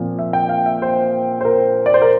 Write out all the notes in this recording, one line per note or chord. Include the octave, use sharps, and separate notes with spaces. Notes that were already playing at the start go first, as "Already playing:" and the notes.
Already playing: A#2 F3 C4
E5
G5
F5
E5
C5
C5
A#4
D5
C5
A#4